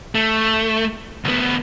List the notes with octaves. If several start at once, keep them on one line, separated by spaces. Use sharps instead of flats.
A3
D2 B3